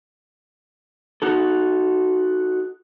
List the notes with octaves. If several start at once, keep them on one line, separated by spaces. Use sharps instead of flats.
D#4 F#4 A4